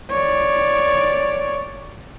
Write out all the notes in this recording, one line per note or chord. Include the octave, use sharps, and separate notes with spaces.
C#5 D5